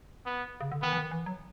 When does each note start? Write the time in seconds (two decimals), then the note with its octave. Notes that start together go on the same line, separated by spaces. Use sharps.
0.26 B3
0.60 C#3
0.72 D3
0.82 D#3 B3
0.93 E3
0.97 D#3
1.11 E3
1.26 F#3